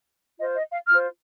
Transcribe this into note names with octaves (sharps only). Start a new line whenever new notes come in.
F4 C5 D#5
D#5
F5
F4 C5 F6